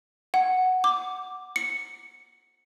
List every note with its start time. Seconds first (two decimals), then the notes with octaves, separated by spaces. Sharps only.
0.34 F#5
0.84 D6
1.56 C#7